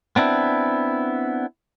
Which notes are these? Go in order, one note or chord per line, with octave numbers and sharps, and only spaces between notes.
B3 C4 D4 E4